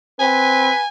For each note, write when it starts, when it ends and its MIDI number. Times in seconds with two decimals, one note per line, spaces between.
0.20 0.70 60
0.20 0.80 71
0.20 0.88 80